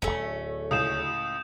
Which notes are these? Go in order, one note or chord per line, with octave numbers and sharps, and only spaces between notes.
D1 G1 A3 C#4
C#2 A2 D#6 G6 E7